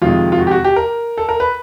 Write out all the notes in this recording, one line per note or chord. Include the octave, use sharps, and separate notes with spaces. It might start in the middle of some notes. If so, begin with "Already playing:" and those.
F2 C3 D#3 G#3 F4
F4
F#4
G4
F#4
G4
A#4
A4
A#4
B4